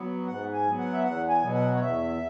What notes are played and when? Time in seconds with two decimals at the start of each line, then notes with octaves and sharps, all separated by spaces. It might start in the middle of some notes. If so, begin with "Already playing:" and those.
Already playing: F#3 B3
0.27 G#2 F#5
0.53 G#5
0.65 F#3 B3
0.78 F#5
0.93 E5
1.04 E2 F#5
1.29 G#5
1.42 B2 F#3 B3
1.54 F#5
1.75 C#5
1.80 E2 E5